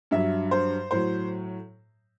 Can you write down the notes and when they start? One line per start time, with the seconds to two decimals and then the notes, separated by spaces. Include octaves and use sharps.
0.11 G2 F#3 E5
0.51 C5
0.91 A2 F#3 C5